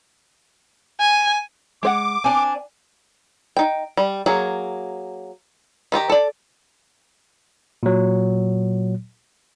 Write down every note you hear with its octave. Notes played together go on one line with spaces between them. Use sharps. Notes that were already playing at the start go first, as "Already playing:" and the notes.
G#5
G#3 C5 F#5 D6
C4 D4 G#5
D#4 G5
G3
F#3 A#3 G#4
D#3 F4 G4 A#5
A4 D5
A#2 F#3